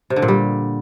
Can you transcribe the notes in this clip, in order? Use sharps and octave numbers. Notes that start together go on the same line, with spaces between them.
C3
D3
A#2
G3